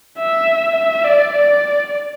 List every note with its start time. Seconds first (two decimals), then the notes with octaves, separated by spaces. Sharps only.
0.19 E5
0.76 E5
1.05 D5
1.33 D5